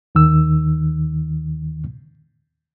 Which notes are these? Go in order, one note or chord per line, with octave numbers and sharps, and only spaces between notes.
D#2 D#3 E6